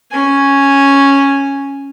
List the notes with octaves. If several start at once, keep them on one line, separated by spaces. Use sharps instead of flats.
C#4 G#5